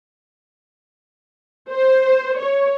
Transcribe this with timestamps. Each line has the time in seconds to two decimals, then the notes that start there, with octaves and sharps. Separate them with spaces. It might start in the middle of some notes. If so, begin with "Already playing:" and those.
1.69 C5
2.39 C#5